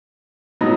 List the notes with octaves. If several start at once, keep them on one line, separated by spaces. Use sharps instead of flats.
A2 F#3 B3 D#4